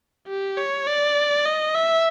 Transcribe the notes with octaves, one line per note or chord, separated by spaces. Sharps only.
G4
C#5
D5
D#5
E5